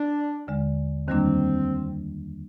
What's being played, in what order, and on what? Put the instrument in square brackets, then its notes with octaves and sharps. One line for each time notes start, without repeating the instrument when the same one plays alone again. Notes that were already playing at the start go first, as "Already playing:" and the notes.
Already playing: [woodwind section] D4
[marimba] D#2 D3 G#3
[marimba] F2 D#3 G3 A#3 D4 [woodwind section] C4